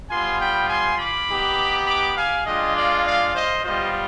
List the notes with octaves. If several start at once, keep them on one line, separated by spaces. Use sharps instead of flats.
G3 B3 F4 G#5 C6
G5 B5
G#5 C6
B5 D6
B3 D#4 G4
B5 D6
F5 G#5
G#3 D4 F4 D#5 G5
D5 F5
D5 F5
C5 D#5
G3 B3 F4 C5 D#5